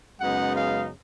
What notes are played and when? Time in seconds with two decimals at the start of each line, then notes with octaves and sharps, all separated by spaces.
0.21 F#2 C#3 G#3 B3 D#4 F#5
0.55 F5